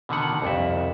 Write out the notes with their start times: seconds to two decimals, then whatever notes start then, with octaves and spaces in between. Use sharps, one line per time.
0.09 B2 D3 D#3 F#5
0.42 C2 F2 E5